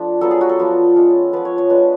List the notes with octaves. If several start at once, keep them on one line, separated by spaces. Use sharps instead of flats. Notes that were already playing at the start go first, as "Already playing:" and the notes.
Already playing: F3 A3 D4
F#3 B3 F4 A4
G#4
F#4
A4
F3 B3 F4
G#3 C#4 F4
F3 B3 F4 B4
C#5
C#5
G#3 B3 D4 F4 B4